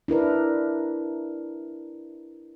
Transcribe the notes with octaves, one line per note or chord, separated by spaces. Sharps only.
D4 E4 A#4 B4